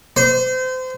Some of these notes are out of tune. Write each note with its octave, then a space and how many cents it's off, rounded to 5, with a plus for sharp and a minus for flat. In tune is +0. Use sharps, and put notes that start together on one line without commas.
C5 -30